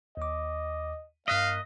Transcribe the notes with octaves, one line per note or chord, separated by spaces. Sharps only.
D#2 D#5 D6
G2 A#3 D#5 F5 F#6 B6